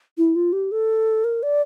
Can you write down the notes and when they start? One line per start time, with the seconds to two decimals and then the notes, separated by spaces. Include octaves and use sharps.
0.18 E4
0.35 F4
0.53 G4
0.71 A4
1.24 A#4
1.43 D5